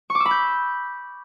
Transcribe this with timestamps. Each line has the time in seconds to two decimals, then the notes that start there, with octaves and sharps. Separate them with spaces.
0.10 C#6
0.15 D6
0.20 E6
0.25 B5
0.31 G6